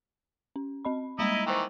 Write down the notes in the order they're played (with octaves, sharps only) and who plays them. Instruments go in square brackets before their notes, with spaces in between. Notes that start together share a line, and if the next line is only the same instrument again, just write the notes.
[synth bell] C#4
C4 D#5 B5
[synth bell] G3 G#3 A#3 [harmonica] D#4 E4 D#5
[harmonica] D#3 E3 [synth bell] C5 G5